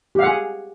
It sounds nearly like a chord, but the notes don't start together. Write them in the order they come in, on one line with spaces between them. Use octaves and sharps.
G4 F5 F#5 G#4